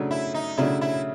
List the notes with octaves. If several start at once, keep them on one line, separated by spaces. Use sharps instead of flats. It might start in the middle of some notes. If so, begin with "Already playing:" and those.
Already playing: C#3 F#3 A3 D4
E4
D#4
C#3 F#3 A3 D4 E4
E4